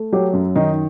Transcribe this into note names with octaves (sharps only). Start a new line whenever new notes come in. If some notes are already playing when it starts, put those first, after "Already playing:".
Already playing: A3
F#3 G4
F#2
D#3 D#4